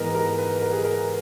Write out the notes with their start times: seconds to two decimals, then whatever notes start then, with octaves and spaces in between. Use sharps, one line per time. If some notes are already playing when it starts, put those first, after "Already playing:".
Already playing: G#2 E3 B3 D#4 A#4 B4 A#5
0.14 A#4
0.38 B4
0.61 A#4
0.73 G#4
0.84 A#4